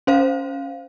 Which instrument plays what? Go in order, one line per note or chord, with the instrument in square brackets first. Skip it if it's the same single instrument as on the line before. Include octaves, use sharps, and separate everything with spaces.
[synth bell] C#4 C5 F5